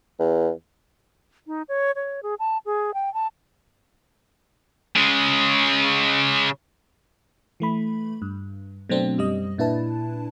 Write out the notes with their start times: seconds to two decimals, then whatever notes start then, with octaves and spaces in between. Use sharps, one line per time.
0.20 E2
1.47 D#4
1.69 C#5
1.96 C#5
2.23 G#4
2.39 A5
2.66 G#4
2.94 G5
3.14 A5
4.96 C#3 G#3
7.60 E3 A3 B5
8.22 G2
8.89 B2 F#3 A3 C4 D4
9.18 F#2 G3 D#5
9.58 A#2 D4 E4 B4 A5